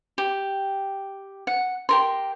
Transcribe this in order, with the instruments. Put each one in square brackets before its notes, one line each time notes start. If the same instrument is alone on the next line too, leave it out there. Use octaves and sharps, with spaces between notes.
[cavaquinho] G4
F#5
G4 A#4 C6